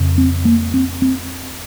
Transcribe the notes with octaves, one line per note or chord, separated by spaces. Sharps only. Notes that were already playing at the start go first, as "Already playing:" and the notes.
Already playing: F2 C#3
C4
A#3
C4
C4